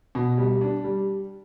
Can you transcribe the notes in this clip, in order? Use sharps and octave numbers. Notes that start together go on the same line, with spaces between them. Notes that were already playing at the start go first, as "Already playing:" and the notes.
B2
G3
D4
G3